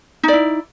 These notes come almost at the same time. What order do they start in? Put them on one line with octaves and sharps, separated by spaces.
D#4 D5 E4